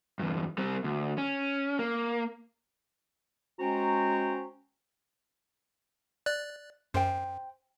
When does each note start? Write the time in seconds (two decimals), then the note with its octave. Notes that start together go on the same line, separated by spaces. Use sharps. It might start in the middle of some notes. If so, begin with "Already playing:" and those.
0.19 E2 G2
0.58 G3 C4
0.84 D2
1.18 C#4
1.79 A#3
3.60 G#3 C#4 F#4 C5 G5 A#5
6.26 D5 F#6
6.94 F#2 C5 G5